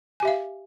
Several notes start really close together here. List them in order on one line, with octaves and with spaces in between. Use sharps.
G#5 G4 E5 F5